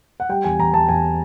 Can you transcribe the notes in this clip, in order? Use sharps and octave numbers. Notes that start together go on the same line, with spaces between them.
F#5
G3 G5
E2 G#5
E2 A#5
E2 A5
E2 G#5